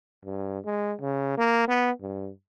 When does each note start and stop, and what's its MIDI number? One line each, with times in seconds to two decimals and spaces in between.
0.25 0.59 43
0.65 0.94 56
1.01 1.37 49
1.37 1.68 58
1.68 1.91 59
2.01 2.30 43